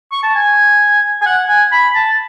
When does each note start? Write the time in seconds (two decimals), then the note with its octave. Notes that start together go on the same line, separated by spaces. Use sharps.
0.12 C#6
0.23 A5
0.35 G#5
1.21 G#5
1.26 F#5
1.49 G#5
1.72 B5
1.95 A5